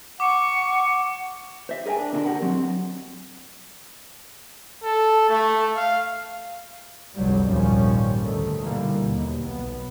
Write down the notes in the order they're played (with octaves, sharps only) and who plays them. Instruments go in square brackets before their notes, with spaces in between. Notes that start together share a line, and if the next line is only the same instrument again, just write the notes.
[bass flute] F#5 [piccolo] C#6 [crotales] D6
[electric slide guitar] C5 E5
G#4 A#4 D5 G5 G#5
D4
B2 D3 D4 F#4 A4 A#4
G4 A#4 F#5
F#3 C4
[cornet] A4
A3
F5
[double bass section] F1 C#2 G2 F#3 G3
A#1 D#2 G#2 F3 G3 C#4
D2 D#3 A3
B2 D3 E3 G3 A#3
D#2 B2
B1 B3